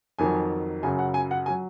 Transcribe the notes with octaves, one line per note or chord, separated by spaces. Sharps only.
F2 D#3 F#3 G#5
F#2 C#3 F#3 G#5
F#5
G#5
F#5
F#3 G#5